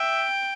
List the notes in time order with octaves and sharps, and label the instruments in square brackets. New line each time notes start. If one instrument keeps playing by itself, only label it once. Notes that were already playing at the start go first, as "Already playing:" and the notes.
Already playing: [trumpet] E5 [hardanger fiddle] G5